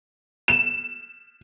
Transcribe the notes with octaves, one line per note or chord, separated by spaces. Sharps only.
E7